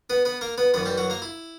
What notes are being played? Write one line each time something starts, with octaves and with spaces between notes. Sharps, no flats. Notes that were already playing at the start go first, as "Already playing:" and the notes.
B3 B4
B3 B4
A#3 A#4
B3 B4
F#2 E3 B3 B4
G3 G4
F#3 F#4
A#3 A#4
E4